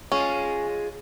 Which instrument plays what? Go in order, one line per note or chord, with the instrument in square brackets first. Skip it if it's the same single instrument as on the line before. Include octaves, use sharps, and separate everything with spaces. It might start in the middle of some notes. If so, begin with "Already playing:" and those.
[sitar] G#3 F4 [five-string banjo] C#4